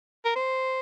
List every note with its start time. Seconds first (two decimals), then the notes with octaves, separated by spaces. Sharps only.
0.25 A#4
0.36 C5